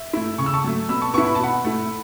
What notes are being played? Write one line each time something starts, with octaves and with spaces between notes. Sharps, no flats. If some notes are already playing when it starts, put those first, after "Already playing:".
Already playing: E5
A3 E4
C#3 C#6
E6
A5 C#6
F#3 A3
B2 B5 E6
A5 C#6
B3 E4 A5 C#6
B5
A5
B2 F#5 B5
A3 E4